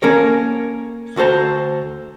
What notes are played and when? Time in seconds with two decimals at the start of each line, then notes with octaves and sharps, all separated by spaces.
0.02 A#3 C#4 A4 A#4 C#5
1.16 D2 F#4 A4 C5 A#5